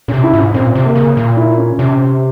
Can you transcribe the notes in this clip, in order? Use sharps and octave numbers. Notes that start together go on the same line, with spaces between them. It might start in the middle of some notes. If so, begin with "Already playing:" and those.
A#2 C#4
C3
E4
G#2
C#4
A#2 C4
C3
A#3
C#3
A#2
E4
C#4
C3 C#4